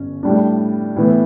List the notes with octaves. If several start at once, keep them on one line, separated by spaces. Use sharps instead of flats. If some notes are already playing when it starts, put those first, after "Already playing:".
Already playing: G1 C#4
A2 G3 D4
A2 E3 B3 E4